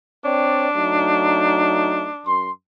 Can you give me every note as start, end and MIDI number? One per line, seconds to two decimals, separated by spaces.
0.25 0.68 60
0.25 2.38 62
0.25 0.68 73
0.25 0.68 74
0.76 2.11 54
0.76 2.11 57
0.76 2.11 63
2.26 2.50 42
2.26 2.50 84